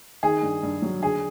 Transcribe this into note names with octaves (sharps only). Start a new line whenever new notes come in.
D#3 G#4
G2
G2
F#3
D3 G#4